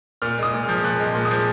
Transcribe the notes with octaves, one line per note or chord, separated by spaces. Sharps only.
A#2 F6
G#3 D#6
A#2
F3 F6
A#2 F#6
G#3
A#2
D#6
F3